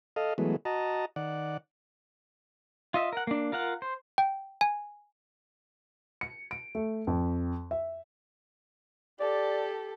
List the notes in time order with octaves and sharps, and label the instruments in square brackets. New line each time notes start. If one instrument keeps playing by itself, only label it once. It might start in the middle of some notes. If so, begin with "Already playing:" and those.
[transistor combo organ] A4 D#5 F5
E3 F#3 G#3 A3 B3
F#4 D#5 A5 A#5
D#3 D5 F#5
[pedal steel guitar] F4 D#5 E5
A#4 F#5
A#3 D4
F4 A#4 F5 F#5
C5
[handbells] G5
G#5
[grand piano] C#7
D7
A3
F2
E5
[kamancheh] G4 A4 [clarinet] D5